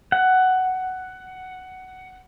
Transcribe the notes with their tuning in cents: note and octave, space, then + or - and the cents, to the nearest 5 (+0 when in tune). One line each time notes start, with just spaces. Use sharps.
F#5 +10